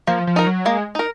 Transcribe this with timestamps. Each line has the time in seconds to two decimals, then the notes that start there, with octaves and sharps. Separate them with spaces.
0.07 F3 A#3
0.27 F3
0.36 D#4 A#4
0.47 F#3
0.65 G#3 A#3
0.95 D#4 A#4